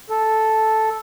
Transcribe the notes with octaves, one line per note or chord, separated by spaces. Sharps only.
A4